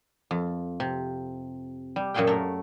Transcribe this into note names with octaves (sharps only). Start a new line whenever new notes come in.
F2
C3
G3
F#2 A#2 F#4 G#4 F5 G5
A3 A#4